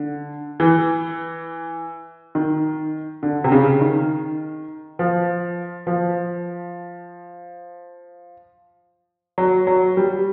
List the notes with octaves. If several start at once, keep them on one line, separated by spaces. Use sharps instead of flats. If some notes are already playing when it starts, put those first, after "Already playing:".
Already playing: D3
E3
D#3
D3
C3
C#3
D#3
F3
F3
F#3
F#3
G3